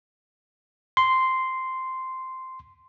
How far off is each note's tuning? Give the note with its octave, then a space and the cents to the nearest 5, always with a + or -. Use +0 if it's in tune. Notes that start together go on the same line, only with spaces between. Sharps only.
C6 -5